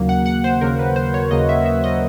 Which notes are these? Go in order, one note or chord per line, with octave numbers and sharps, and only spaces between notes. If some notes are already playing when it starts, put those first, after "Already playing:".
Already playing: D#2 C#3 F#3 A#3
F#5
F#5
C5
D#2 C#3 F#3 A#3 A#4
B4
C5
C#5
D#2 C#3 F#3 A#3 D#5
E5
E5
D#5